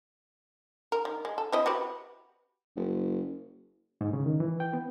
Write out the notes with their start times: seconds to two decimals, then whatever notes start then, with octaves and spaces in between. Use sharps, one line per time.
0.92 A#4
1.05 D#3
1.25 G#3
1.38 A4
1.52 C4 E4 D#5
1.66 F#4 G4 B4
2.76 F#1
4.01 G#2
4.13 C#3
4.26 D#3
4.40 E3
4.60 G5
4.73 B3